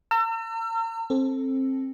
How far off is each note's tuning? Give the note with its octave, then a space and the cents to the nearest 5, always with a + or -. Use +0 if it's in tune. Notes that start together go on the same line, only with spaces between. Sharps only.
A#5 -40 E6 +40
C4 +20 A4 +0